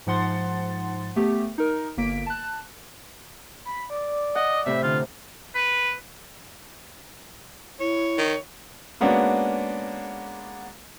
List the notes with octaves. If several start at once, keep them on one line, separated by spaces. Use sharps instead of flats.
G#2 F3 F#5 C6 A6
A3 B3 G4
D#4 A#4
G1 A#3 B6 D7
A5 F#6
B5
D5
D#5 F#5
A2 C3 E5
D3 F4
B4
E4 C#5
D#3
G#3 A#3 B3 C#4 D4 F#4